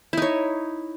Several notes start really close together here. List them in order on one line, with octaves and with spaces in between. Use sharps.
E4 D#4 C#5